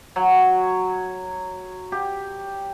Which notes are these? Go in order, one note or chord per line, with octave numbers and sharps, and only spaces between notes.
F#3
G4